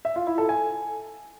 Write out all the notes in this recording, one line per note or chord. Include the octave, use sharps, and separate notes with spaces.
E5
F4
E4
A4
G#5